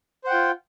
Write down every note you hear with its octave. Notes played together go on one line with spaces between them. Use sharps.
F4 C5 F#5 G5